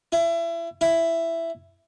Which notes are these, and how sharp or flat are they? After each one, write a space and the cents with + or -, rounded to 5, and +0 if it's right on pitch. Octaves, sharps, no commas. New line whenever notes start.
E4 +30
E4 +10